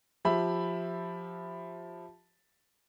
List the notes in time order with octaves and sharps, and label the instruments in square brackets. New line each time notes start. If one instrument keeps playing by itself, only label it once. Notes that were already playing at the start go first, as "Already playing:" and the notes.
[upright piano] F3 G4 E5 B5